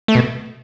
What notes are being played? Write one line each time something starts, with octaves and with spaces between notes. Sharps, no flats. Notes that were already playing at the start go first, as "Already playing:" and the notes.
A3
B2